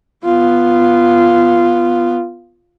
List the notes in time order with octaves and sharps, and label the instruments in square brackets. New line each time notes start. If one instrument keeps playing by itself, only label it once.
[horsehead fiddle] B3 F4